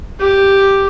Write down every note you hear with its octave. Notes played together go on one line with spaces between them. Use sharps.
G4